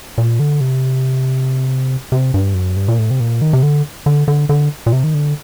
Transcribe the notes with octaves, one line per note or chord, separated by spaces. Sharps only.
A#2
D3
C3
C3
G2
F#2
G2
A#2
A2
C3
A#2
D#3
C3
D3
D3
D3
D3
A#2
C3
D#3
D3